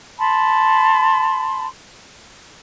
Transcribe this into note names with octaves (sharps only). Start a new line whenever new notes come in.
A5 B5 C6